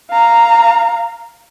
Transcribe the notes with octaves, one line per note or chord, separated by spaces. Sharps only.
F5 A#5